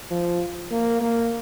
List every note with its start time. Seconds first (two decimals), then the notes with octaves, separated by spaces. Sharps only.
0.11 F3
0.71 A#3
1.01 A#3